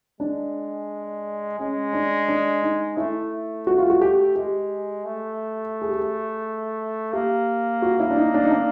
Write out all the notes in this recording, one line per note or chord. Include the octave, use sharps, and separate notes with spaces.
G#3 D4
G#3 C#4
D4
D4
D#4
A3 E4
F#4
F4
F#4
G4
G#3 G4
A3
G#4
G4
G#4
A#3 G4
F#4
E4
D4
D#4
D4
D#4
D4